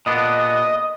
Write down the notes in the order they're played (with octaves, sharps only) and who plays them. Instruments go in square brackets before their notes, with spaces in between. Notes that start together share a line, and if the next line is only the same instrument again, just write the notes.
[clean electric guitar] A#2 B3 D4 [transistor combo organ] D#5